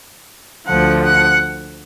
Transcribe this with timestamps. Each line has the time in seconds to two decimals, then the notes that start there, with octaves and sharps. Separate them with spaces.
0.66 D2 D3 F3 F#5
1.04 F#5